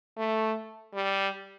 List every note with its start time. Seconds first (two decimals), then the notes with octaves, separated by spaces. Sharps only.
0.17 A3
0.94 G3